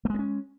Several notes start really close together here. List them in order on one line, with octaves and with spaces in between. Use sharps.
A3 G#3 B3 C#4